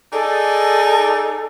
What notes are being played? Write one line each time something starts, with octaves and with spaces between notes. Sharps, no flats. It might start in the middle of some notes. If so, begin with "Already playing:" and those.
D#4 G#4 A4 D5